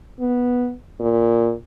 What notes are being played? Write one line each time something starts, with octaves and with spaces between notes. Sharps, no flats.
B3
A#2